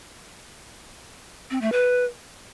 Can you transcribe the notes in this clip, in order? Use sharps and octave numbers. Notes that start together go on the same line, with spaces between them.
C4
A3
B4